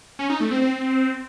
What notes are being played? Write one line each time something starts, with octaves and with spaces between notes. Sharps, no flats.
C#4
D#4
A3
C4
C4